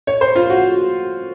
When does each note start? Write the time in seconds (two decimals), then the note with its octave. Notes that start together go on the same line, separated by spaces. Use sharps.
0.07 C#5
0.21 C5
0.35 F4
0.50 F#4